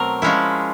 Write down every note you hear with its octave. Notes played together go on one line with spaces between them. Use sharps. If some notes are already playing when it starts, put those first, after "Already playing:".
Already playing: B2 F#3 A3 C4 A#4
F3 G#3 C#4 E4